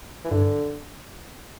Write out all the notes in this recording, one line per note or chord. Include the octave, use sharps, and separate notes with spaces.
E3
G2 D3